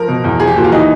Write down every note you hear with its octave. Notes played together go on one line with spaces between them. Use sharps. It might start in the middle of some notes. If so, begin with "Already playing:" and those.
Already playing: F3 A#4
B2
E2
F3 G#4
G4
A#2 F#4
F4
E3 D#4